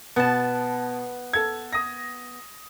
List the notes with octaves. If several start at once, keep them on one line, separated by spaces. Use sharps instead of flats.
B2 B3 A5
A4 G#6
D#6 A#6